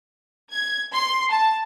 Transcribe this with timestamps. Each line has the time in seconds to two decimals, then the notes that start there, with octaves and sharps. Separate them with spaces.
0.50 G#6
0.93 C6
1.30 A5